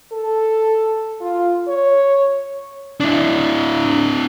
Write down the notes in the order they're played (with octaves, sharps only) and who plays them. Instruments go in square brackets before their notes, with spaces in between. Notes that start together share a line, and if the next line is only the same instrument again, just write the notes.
[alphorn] A4
F4
C#5
[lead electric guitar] D4 E4